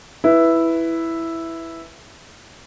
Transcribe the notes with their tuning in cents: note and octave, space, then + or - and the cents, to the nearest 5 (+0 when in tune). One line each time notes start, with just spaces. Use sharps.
E4 +0 B4 +0